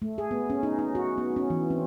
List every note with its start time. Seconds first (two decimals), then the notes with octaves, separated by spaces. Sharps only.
0.02 A3
0.18 G#4
0.31 B3
0.50 C#4
0.63 D#4
0.78 D#4
0.95 F#4
1.18 B3
1.36 C#4
1.50 E3
1.70 C4